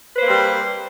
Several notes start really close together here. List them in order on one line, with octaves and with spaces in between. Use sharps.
B4 C5 A#3 C4 G3